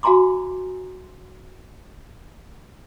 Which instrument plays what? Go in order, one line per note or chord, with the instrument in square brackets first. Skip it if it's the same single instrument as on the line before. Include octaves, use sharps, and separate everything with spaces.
[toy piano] F#4 F5 G#5 A#5 C6 D6